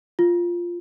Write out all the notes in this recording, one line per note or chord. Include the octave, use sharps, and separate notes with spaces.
F4